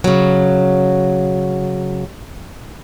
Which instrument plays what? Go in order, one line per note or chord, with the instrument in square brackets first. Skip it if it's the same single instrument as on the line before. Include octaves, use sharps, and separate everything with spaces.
[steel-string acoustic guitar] C#3 F#3